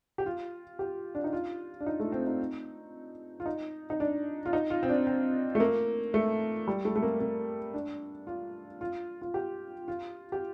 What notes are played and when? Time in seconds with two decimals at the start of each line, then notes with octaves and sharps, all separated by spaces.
0.18 G4
0.26 F4
0.79 G4
1.15 D4
1.24 D#4
1.33 F4
1.81 D4
1.86 D#4
2.00 A3
2.12 C4
2.27 D#4
3.40 F4
3.46 D#4
3.90 D#4
4.00 D4
4.46 F4
4.53 D#4
4.70 F4
4.83 C4
4.89 D4
5.07 C4
5.55 A3
5.60 A#3
6.14 A3
6.68 G3
6.85 A3
6.96 A3
7.02 A#3
7.20 A#3
7.74 D4
8.27 F4
8.81 F4
9.22 F4
9.34 G4
9.88 F4
10.32 G4